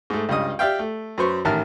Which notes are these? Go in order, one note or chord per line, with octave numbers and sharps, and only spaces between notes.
G#2 A3
C#2 G2 D#5 D#6
G4 D5 E5 F5 G5
A3
F#2 B4 C5 C#6
A1 D#3 A#4 E5 A5 F6